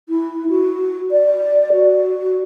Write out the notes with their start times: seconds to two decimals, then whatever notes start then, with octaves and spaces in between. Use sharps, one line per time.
0.09 E4
0.49 F#4
1.11 D5
1.72 F#4